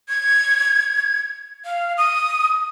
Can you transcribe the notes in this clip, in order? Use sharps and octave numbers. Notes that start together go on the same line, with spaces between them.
G#6
F5
D#6